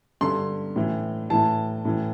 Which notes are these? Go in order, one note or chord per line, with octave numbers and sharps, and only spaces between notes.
G2 D3 C6
A2 E3
A2 E3 A5
A2 E3